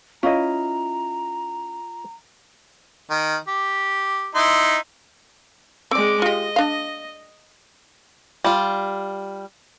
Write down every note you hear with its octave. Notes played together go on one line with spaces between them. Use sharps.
C#4 E4 F4 D#5 A#5
D#3
G4
D#4 E4 C6
G#3 C4 D5 D6
F4 G4 D#5
D4 F5
G3 F4